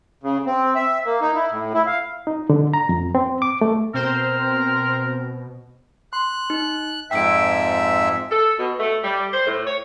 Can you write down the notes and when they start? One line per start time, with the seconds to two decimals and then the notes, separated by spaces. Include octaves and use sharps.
0.23 C#3
0.46 C4
0.75 E5
1.06 A#3
1.21 D#4
1.35 E4
1.51 A2
1.74 E4
1.87 F5
2.27 D#4
2.50 D3
2.74 A#5
2.89 F2
3.15 C4
3.42 D6
3.61 A3
3.94 B2 C4 A#4 C5
6.13 C6 F#6
6.50 D#4
7.11 F2 G#2 E5 G5 E6 D7
8.31 A4
8.59 B2
8.80 A3
9.04 G3
9.33 C5
9.46 A2
9.66 C#5